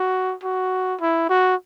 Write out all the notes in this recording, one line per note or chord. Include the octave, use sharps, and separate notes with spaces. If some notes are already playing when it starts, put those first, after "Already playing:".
Already playing: F#4
F#4
E4
F#4